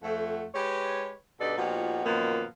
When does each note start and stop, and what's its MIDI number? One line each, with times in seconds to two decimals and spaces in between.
0.03 0.45 41
0.03 0.45 57
0.03 0.45 78
0.55 1.12 56
0.55 1.12 67
0.55 1.12 71
0.55 1.12 73
1.40 1.57 43
1.40 1.57 47
1.40 1.57 63
1.40 1.57 69
1.40 1.57 71
1.40 1.57 74
1.58 2.02 46
1.58 2.02 53
1.58 2.02 59
1.58 2.02 63
1.58 2.02 66
1.58 2.02 67
2.05 2.44 42
2.05 2.44 46
2.05 2.44 51
2.05 2.44 53
2.05 2.44 58
2.05 2.44 59